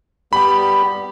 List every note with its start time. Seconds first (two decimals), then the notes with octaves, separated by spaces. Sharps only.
0.33 G3 B3 G4 B5